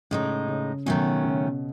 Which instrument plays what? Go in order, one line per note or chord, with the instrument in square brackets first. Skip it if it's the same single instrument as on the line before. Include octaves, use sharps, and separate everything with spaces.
[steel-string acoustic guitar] A2 G#3 D#4 [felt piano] C#3
[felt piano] C#3
[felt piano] B2 [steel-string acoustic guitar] D#3 F#3 A3 C#4
[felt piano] C#3